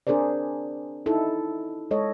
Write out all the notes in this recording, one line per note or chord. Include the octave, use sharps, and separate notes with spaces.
C4 D4 G#4 A#4 C5 D5
D#4 E4 A4
G#3 A4 C#5 D#5